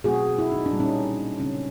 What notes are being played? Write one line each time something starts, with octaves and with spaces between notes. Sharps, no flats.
B2 F#3 A3 C4 F#4 G#4
E4
D#4
D4
A#2 G3 A#3
C#4 D#4
C#3 F#3 A3 C4 C#4